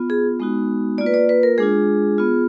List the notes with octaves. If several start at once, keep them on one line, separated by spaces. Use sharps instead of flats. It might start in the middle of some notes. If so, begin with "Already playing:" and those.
Already playing: B3 F4
G#4
G#3 B3 D#4 F#4
A#3 F4 D5
B4
D5
B4
A#4
G#3 D4 F4 G#4
B3 F4